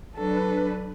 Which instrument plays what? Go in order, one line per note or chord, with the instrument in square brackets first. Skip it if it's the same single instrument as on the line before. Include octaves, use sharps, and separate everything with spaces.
[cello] F#3 [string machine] D4 B4 [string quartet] A4